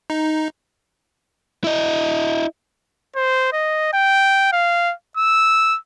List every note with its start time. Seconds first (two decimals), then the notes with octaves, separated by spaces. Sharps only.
0.10 D#4
1.64 E4 D#5
3.16 C5
3.53 D#5
3.93 G5
4.53 F5
5.17 E6